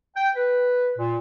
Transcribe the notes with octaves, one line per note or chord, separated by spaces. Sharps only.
G5
B4
A#2